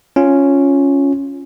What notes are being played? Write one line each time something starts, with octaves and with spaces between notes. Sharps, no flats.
C#4 F4